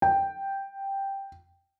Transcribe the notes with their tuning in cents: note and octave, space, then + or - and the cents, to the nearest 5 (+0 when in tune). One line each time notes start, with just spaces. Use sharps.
G5 +0